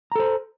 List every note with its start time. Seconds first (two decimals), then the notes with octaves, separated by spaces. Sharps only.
0.12 A#5
0.16 A4
0.19 C5